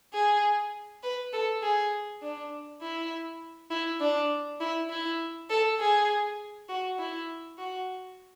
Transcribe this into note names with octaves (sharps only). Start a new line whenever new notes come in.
G#4
B4
A4
G#4
D4
E4
E4
D4
E4
E4
A4
G#4
F#4
E4
F#4